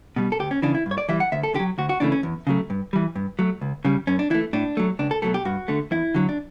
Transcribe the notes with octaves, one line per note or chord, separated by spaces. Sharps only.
B2 G3
A4
D2 G4
C#4
C#3 E3 D4
E4
G2
C#5
D5
E3 G3 E5
F#5
D2 E5
A4
D3 G4
F#3
D2 F#4
F#4
C#3 E3 A3 D4
C#4
E2
C#3 F#3 A3
G2
E3 G3
G2
F#3 A3
C#2
C#3 G3
F#2 C#4
D4
E3 A3 E4
A2 D4
F#3 A3
C#2 D4
A4
B2 F#3 A3 A4
G4
G2 F#4
D3 A3
E2 E4
D3 F#3
D4